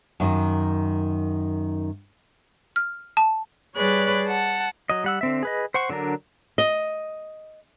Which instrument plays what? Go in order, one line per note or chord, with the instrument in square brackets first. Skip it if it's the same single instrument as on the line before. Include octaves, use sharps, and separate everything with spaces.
[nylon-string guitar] F#2 D#3
[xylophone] F6
A5
[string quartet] G3 G#4 B4 C#5 D5 F#6
F#5 A5
[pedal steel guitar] F#3 D#5
G3 F#5 E6
D3 C4 E5
G#4 B4 D#5
C5 F#5 C#6
D3 F#3 D4 A#4
[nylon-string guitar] D#5